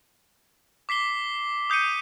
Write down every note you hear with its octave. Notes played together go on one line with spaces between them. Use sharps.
D6 B6 C7 G7
D#6 G6 C7 C#7 D#7